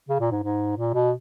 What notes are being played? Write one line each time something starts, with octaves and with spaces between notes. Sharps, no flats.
C#3
A#2
G#2
G#2
A#2
B2